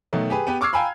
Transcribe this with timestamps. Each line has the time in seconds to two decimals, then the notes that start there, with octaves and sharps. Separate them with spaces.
0.13 B2 D#3 F#3 A3
0.30 G4 G#4 B4
0.47 B3 G4 B4
0.61 C#6 D6 E6 F6 G#6 C7
0.73 F5 G5 G#5 A#5 B5 E6